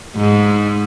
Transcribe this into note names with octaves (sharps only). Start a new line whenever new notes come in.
G#2